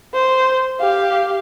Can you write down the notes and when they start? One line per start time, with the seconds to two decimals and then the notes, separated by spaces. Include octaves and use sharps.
0.13 C5
0.80 G4 F5